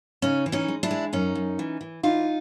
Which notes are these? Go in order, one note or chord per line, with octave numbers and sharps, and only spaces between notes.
C#3 C#4 D#4
E3
C#4 D#4
G#3
D4 E4
G#3
F#2 C#4 D#4
F#2
E3
E3
E3 D#4 F4